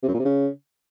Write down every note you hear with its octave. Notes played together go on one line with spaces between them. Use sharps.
C3
F#2
A#2
C3
C#3